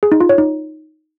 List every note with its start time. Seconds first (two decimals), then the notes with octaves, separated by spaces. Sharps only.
0.03 G#4
0.12 D#4
0.20 F4
0.29 C#5
0.38 D#4